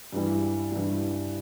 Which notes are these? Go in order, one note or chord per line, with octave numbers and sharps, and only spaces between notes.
G2 E3 G3
G2 E3 G3